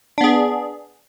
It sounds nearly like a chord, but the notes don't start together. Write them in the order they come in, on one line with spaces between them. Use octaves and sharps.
D4 B3 G#4